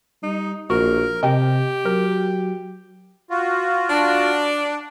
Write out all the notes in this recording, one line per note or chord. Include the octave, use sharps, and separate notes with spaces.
G3 D#4
A#1 F#4 A#4
C3 G4 D#5 G5
F#3 A#4
F4 F#4
D4